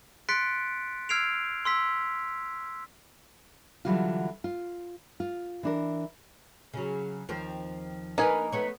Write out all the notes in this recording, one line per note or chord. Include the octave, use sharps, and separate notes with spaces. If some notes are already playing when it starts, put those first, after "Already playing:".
C6 F#6 A6 B6 C#7 D7
E6 F6 G#6 C7 D7 F7
C6 E6 B6
D3 E3 F#3 G3 F4
F4
F4
E3 D4 A#4
C#3 F#3
D#2 F3 C4
A#3 D4 D#4 B4 G#5
A3 B3 C#5